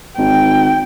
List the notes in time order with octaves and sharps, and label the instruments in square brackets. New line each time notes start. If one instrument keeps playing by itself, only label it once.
[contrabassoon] G#1 [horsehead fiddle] G5